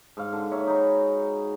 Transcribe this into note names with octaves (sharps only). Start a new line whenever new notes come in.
G#2 F5
D3
G#2 A#3 C#5 E5
D#4 F#4 G#4 B5